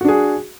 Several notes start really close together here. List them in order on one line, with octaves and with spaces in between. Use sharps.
F#4 D4 G#4